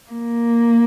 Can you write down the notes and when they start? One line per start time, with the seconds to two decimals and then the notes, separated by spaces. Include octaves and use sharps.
0.12 A#3